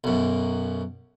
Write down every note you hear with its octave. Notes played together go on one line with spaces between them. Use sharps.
B1 F#2